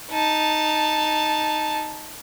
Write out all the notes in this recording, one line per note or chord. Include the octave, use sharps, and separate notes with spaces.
D#4 A5